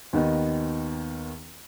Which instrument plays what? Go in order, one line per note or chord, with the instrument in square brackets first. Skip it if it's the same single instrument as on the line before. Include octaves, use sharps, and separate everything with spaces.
[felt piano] D#2 D#3 B3 D#4